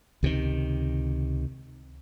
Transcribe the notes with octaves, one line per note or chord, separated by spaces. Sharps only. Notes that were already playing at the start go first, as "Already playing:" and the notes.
C#2 C3 D#3